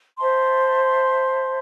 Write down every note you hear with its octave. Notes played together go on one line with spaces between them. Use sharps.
C5 E5 A5 C6